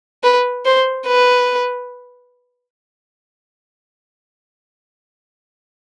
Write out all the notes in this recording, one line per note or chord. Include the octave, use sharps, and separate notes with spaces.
B4
C5
B4